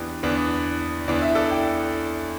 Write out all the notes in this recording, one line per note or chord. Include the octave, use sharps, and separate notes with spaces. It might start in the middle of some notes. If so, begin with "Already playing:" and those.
Already playing: E2 E3 B3 D4 G4 B4
E2 E3 B3 D4
E2 E3 B3 D4 D5
E5
A4 D5
G5